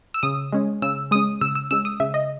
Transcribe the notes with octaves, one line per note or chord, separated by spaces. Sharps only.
E6
C#3 D#6
G#3 C#4
C#3 E6
G#3 C#4 D#6
C#3 E6
E6
G#3 C#4 E6
D#6
C#3 E5
D#5